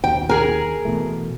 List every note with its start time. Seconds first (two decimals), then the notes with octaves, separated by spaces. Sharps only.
0.04 D#2 G5
0.29 G#4 A#4 G#5
0.85 B2 E3 A3